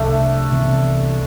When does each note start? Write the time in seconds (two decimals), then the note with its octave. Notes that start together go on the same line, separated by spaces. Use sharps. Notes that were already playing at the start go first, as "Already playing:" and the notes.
Already playing: C2 C3 F3 A3 D4
0.52 C2 C3 E3 B3